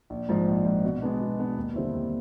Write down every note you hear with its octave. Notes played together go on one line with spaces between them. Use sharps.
A#1
G#2 F3
A#1
G#2 F3
B2
G#3 B3 D4
B2
G#3 B3 D4
D#2
D3 G3 C4 E4
D#2